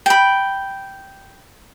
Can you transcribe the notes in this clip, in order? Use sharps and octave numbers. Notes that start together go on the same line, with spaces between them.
G5 B5